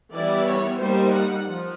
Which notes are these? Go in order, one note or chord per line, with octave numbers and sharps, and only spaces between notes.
E3 G3 B3 E4 D5
C#5
G3 A#3 D#4 C5
F#5
F3